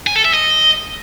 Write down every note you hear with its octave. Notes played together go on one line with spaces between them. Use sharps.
G#5
A4
E5
D#5